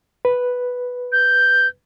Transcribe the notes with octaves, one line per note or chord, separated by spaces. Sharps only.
B4
G6